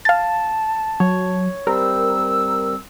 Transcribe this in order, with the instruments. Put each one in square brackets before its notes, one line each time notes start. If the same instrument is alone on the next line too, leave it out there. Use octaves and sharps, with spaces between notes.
[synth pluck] F5 A6 [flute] A5
[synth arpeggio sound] F#3 [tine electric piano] C#5
[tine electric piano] G3 C4 [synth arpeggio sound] A#4 [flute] E6